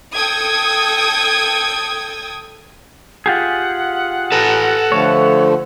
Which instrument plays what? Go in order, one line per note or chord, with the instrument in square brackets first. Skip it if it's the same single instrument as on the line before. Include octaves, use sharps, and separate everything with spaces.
[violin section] A4 G5 D#6 G#6
[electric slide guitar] F4 G4 G#4 [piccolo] F#5
[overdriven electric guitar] A4 B4
[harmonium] D3 F3 A3 [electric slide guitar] C#5